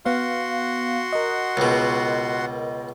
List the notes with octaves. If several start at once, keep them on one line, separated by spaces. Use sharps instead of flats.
B3 F#4 F5 F#5 C6
A#4 D#5
C#2 B2